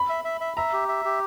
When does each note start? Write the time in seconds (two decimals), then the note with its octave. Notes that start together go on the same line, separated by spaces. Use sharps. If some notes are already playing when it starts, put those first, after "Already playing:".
Already playing: B5
0.09 E5
0.25 E5
0.41 E5
0.57 E5 A#5
0.73 G4
0.88 E5
1.05 G4